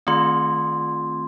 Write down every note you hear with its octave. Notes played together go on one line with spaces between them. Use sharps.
D#3 A3 C4 F4 C6